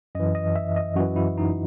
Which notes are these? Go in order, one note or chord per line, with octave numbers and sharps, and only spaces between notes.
F#2 E3 D#5
D#5
E5
D#5
F#2 E3 F#4
E4
D#4